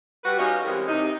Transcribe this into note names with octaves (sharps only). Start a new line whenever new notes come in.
G3 F#4 B4
G3 C#4 D#4 F4 F#4 D#5
E3 G3 G#3 C4 C#4 A#4
C3 D#4